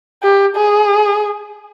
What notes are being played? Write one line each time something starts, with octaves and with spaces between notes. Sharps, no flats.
G4
G#4